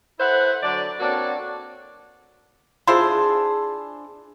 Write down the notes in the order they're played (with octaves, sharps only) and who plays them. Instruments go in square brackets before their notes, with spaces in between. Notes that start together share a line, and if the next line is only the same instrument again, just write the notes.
[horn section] E4 A4 B4 C5 E5 F#5
D3 F#3 D4 D5
A#3 C4 D4 F#4 A4 C#5
[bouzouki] D4 G#4 A5 [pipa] E4 F4 C5